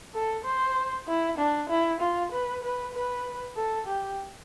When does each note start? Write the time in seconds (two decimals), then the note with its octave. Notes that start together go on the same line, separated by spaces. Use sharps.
0.14 A4
0.45 C5
1.08 E4
1.38 D4
1.69 E4
2.00 F4
2.32 B4
2.63 B4
2.94 B4
3.56 A4
3.87 G4